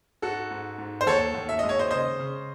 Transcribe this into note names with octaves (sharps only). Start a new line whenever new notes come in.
G#2 F#4 A4
G#2
G#2
C5
D#2 A4 C#5
D#2
E5
G#3 D#5
C#5
C5 D#5
C#3 C5 D#5
C#3